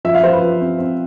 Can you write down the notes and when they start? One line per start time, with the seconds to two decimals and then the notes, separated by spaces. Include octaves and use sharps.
0.05 F3 E5
0.14 F5
0.23 F3 C5
0.33 B4
0.42 F3
0.60 C4
0.78 C4